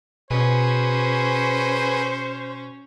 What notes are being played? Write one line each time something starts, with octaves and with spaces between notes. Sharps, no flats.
B2 C#4 G#4 B4 C5